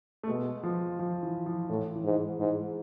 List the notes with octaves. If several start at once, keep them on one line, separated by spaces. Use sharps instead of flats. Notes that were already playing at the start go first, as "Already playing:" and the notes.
A3
B2 G#3
F3
F3
E3
F3
A2 E3
E3
G#2
G#2